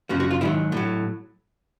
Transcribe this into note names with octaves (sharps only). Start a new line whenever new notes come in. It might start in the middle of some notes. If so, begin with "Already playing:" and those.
F#2 C#3 F3 F#4
F#4
F4
G#2 D#3 F#3 E4
A2 F#3